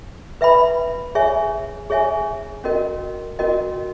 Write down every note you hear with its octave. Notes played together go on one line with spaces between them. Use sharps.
B4 E5 G5 B5
G#4 C#5 E5 G#5
G#4 C#5 E5 G#5
C#4 F#4 A#4 D#5 G5
C#4 F#4 A#4 D#5 G5